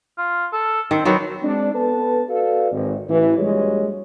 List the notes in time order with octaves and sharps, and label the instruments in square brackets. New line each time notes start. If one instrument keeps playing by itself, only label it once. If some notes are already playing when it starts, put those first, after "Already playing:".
[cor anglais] F4
A4
[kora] D#3 [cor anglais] C4
[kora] D#3 F#3 B3 [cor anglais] C4
[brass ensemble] G#3 C4 D4
B3 A4 B4 A5
F#4 A4 B4 D5 F5
G#1
A1 E3
A#1 G3 G#3 F#4 C#5